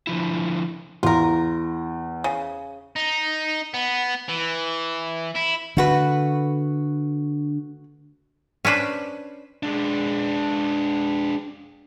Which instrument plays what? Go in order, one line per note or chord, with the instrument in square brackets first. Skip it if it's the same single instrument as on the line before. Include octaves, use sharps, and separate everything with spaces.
[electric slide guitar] D3 F3 E4
[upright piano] E2 [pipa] F4 A#4
[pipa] C#3
[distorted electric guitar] D#4
B3
E3
E4
[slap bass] D3 [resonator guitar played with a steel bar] A3 F#4 B4
[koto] C#4 D4 B4 C5
[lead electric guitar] G#3 D4